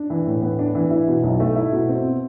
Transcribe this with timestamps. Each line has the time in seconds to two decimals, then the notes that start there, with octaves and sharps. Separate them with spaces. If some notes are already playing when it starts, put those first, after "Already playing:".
Already playing: D4
0.10 E3
0.26 A2
0.42 B3
0.59 D4
0.75 E3
0.91 E4
1.08 B2
1.24 B1
1.40 A3
1.56 E4
1.72 B2
1.89 C4